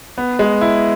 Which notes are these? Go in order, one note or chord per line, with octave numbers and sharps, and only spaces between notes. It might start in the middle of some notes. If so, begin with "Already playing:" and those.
B3
G#3
E4